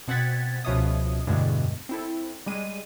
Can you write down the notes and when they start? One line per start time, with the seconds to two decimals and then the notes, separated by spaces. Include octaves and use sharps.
0.08 B2 C4 F#5 G#6 A6 B6
0.65 C#2 B2 F3 C#5 E5 D#6
1.27 E2 G2 B2 D3 G#3 A3
1.89 C4 E4 A4
2.46 G3 G#3 D#7